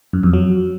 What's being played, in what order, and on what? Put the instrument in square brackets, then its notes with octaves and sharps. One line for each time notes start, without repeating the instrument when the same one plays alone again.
[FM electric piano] F#2
F2
F#3